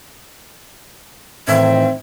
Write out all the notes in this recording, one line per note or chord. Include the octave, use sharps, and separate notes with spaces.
A2 D#3 E3 C4 E5